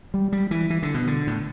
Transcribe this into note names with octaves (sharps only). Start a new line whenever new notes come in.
G3
G3
E3
E3
D3
B2
D3
A2